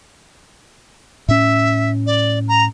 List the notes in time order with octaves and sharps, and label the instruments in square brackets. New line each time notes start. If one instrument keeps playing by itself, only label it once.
[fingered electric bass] A2 C#4 [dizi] E5
[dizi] D5
A#5